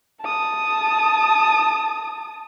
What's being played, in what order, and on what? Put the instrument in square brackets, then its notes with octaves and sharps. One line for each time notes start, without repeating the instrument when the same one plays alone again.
[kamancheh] A5 D#6